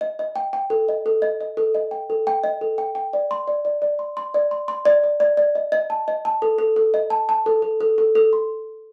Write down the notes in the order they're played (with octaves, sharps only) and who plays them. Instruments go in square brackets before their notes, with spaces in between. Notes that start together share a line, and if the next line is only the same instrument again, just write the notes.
[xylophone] D#5
D#5
G5
G5
A4
D#5
A4
D#5
D#5
A4
D#5
G5
A4
G5
D#5
A4
G5
G5
D5
C6
D5
D5
D5
C6
C6
D5
C6
C6
D5
D5
D5
D5
D#5
D#5
A5
D#5
A5
A4
A4
A4
D#5
A5
A5
A4
A4
A4
A4
A4
C6